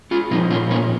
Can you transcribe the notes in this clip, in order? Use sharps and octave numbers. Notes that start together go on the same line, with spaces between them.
C#4 F4
A#2 F3 C4 D#4
C#4 F4
A#3 C#4